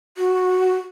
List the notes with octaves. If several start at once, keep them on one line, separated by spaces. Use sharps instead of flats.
F#4